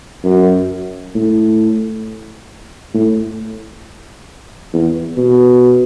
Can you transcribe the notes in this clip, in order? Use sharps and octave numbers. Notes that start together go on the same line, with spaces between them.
F#2
A2
A2
E2
B2